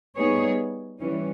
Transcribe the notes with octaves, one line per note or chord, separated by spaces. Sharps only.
G3 B3 D#4 G#4 C#5
E3 G3 C#4